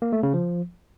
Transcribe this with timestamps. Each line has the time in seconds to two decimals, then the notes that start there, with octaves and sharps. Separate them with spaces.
0.02 A#3
0.13 A3
0.23 C#3
0.34 F3